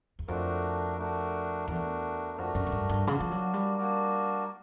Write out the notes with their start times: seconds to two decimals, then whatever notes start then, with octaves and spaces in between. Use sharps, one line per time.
0.19 E2
0.28 F2 A3 D4 F#4 A#4
0.98 A3 D4 F#4 A#4
1.68 E2 A3 D4 F#4 A#4
2.38 F2 A3 D4 F#4 A#4
2.55 F#2
2.67 G#2
2.72 G2
2.89 G2
3.07 C#3 A#3 D4 F#4 A#4 D5
3.20 F3
3.31 F#3
3.53 G3
3.78 A#3 D4 F#4 A#4 D5